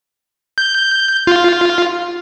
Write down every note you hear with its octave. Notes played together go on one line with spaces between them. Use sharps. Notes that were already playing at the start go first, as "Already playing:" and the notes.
G6
F4